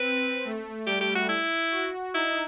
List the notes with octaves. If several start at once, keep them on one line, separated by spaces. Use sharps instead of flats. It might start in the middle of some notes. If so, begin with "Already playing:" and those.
Already playing: C4 B4
A3
G3 G4
G4
F#4
E4
F#4
D#4 E4